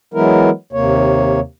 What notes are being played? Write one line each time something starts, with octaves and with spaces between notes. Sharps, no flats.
E3 F#3 G#3 B3 E4 A#4
D#2 C3 A#3 C#5